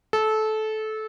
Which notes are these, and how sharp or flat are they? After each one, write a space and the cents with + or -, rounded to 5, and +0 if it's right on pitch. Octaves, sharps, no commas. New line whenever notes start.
A4 -20